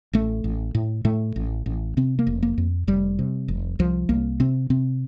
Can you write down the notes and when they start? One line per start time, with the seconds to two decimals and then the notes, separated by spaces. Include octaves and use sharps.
0.13 A1 A3
0.44 A1
0.75 A2
1.05 A2 A3
1.36 A1
1.66 A1
1.97 C3 C4
2.19 A#3
2.27 F1
2.43 A#3
2.58 F2
2.87 F1 G3
3.19 C3
3.48 F1
3.79 C2 F3
4.09 C2 A#3
4.40 C3 C4
4.70 C3 C4